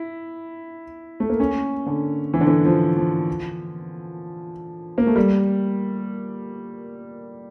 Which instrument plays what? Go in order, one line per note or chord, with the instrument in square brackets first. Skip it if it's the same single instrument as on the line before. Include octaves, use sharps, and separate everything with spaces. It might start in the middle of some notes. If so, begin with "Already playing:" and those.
Already playing: [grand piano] E4
A3
A#3
C#4
D3
E3
D3
E3
F3
F3
A#3
A3
G3